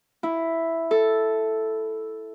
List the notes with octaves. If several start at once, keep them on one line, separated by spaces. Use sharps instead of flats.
E4
A4